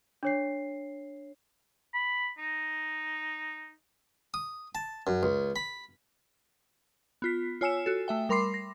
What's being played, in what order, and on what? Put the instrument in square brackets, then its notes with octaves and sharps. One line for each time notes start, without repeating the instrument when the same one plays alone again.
[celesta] D4 C#5 C7
[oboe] B5
D#4
[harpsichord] D#6
A5
F#2
C#2
B5
[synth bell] B3 F4 B6
F4 C#5 G#5 E6 C#7 E7
F#4 A4
A3 E5 G5
G3 A#4 B5 C6 D6 C7
A#6